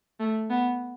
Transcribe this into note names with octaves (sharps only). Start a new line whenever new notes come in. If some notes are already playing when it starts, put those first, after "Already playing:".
A3
B3